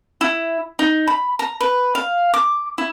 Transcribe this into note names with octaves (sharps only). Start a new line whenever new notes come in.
E4
D#4
B5
A#5
B4
F5
D6
E4